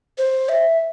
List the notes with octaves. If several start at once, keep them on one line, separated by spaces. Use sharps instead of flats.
C5
E5